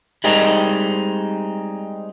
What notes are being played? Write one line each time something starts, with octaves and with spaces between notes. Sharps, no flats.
G3 G#3 C4 D#4